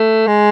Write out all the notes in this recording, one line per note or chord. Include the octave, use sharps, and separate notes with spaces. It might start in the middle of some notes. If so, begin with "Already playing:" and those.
Already playing: A3
G#3